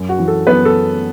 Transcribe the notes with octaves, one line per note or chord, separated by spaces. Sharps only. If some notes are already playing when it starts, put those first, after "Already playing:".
Already playing: F#2
F#4
E3
A4
F#2 B3 B4
A4